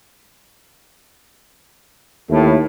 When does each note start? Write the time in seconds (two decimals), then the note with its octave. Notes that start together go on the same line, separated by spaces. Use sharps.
2.30 D#2 A2